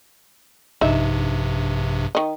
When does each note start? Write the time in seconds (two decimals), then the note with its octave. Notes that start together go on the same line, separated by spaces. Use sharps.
0.81 A#1 G2 C3 D#4 E5
2.15 D#3 D#5